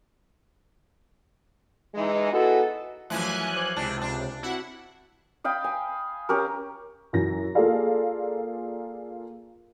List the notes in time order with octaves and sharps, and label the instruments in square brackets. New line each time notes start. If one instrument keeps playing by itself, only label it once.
[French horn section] E3 G#3 D#4
B3 D#4 E4 F#4 G#4 A4
[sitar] F#2 E3 F3 [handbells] A3 E5 [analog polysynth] G#5 F#6
[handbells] C5 D6
[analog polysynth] C#2 C3 [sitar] D4
[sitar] D4
[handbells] C4 F#4 [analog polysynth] E4 F#5
[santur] D#5 F5 G5 B5
G#5
C#4 G4 A#4
[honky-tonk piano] F#2 E3 A#6
A#3 F4 G#4 A4 D5 F5